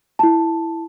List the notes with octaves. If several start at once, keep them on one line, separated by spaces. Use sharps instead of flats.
E4 A5